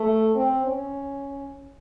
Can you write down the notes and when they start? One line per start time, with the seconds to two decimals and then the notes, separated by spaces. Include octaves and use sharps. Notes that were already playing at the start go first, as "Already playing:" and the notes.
Already playing: A3
0.35 C4
0.67 C#4